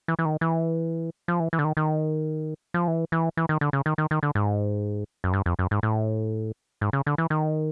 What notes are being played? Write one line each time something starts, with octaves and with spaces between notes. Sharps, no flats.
E3
E3
D#3
E3
F3
E3
E3
D3
D#3
D#3
F3
E3
E3
E3
D#3
D3
C#3
D#3
D#3
D#3
D3
G#2
F#2
G2
F2
F#2
G#2
A2
G#2
C#3
D3
E3
D#3